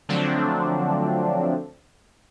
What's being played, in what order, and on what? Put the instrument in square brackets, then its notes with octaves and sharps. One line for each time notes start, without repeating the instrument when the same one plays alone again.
[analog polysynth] D3 F3 F#3 A3 C4 D4